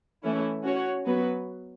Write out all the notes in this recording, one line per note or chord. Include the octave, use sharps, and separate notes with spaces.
E3 A3 C#4 E4
C#4 F#4 C#5
F#3 B3 F#4 B4